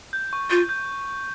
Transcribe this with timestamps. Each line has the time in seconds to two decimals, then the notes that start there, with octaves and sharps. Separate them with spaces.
0.13 G6
0.33 C#6
0.50 F4 G6
0.69 G6